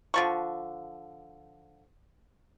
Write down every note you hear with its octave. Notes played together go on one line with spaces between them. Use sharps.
D3 F3 C#6